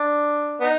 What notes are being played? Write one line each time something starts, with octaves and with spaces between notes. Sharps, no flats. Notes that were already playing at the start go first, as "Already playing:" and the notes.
Already playing: D4
B3 D#4